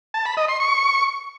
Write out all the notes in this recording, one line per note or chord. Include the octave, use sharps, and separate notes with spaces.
A5
B5
D#5
C6
C#6